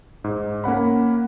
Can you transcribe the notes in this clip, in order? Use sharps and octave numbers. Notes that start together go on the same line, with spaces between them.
G#2
A#3 C#4 F#5 B5